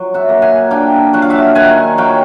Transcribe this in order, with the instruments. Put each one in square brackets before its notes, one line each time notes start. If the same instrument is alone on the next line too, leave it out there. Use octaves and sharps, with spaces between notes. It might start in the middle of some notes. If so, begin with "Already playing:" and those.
Already playing: [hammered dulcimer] F#3
E5 F#5
A#3
F#5 G#5
D4 F5 G5
F#3 F#5
F5
E5 F#5
D#3 F#5 G#5
F#3 F5 G5